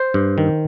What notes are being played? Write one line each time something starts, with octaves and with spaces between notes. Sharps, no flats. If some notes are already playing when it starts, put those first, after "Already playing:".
Already playing: C5
G2
D#3